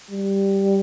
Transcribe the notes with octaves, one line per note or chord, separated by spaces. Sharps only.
G3